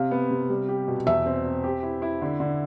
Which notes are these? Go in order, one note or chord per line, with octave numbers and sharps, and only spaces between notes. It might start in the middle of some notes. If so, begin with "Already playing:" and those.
Already playing: C3 F5
B3
C3
G3
G4
B2
E2 E5
C4
C4
G4
E4
E4
D3
D3